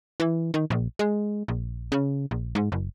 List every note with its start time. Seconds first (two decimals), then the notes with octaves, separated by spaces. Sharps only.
0.20 E3
0.54 D#3
0.70 A#1
0.99 G#3
1.48 A#1
1.92 C#3
2.31 A#1
2.55 G#2
2.72 F#1